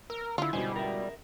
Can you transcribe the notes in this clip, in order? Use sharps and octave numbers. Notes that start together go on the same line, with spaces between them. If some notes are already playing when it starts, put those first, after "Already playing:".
A#4 E6
D3 E4 F4
C#2 B2 D3 G3 C5 D#5 G#5
A#4 E5